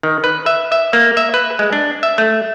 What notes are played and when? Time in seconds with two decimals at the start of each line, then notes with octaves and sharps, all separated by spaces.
0.03 D#3
0.24 B4
0.46 E5
0.72 E5
0.93 A#3
1.17 E5
1.34 B4
1.59 G#3
1.73 D4
2.03 E5
2.18 A3